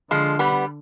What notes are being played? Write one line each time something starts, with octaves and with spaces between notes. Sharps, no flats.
D3 F3 G#3
G3 B3